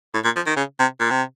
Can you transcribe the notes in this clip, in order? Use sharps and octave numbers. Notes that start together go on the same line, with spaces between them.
A2
A#2
F3
D#3
C#3
C3
A#2
C3